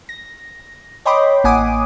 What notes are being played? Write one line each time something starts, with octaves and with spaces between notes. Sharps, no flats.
A#6
C#5 D#5 G5 B5 C6 D6
A1 A#3 F#5 G#5 D6 D#6